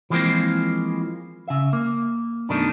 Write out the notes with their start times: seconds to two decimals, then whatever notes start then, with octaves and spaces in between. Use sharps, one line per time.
0.10 E3 F3 G#3 A#3 C4
1.48 C#3 E5
1.73 A#3
2.49 F#2 B2 D#3 A3 D4 D#4